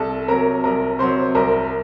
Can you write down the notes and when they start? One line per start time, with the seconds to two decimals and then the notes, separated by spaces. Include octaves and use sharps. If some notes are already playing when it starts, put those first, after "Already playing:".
Already playing: C2 A4 A5
0.28 C3 F#3 A#4 A#5
0.64 C2 A#4 A#5
0.99 C3 F#3 C5 C6
1.35 C2 A#4 A#5